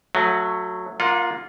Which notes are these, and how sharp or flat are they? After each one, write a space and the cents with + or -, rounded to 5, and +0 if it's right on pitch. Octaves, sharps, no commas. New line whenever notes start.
F#3 -15 A3 +10
A#3 +0 F4 +0 F#5 -35